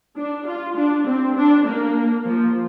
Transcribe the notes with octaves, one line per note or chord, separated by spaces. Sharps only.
D4
F4
D4
C4
D4
A#3
F3